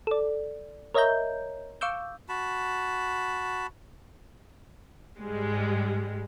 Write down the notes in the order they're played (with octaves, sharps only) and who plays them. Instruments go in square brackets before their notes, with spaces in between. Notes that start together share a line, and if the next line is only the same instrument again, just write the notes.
[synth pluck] A4 D5
A#4 C#5 D#5 E5 A#5 G6
F5 C#6 D6 E6 G6
[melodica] F#4 A5 B5
[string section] G#2 G3 G#3